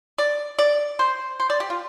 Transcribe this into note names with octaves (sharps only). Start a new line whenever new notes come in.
D5
D5
C5
C5
D5
G4
F4